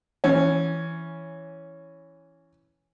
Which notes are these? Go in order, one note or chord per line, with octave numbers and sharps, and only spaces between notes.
E3 C#4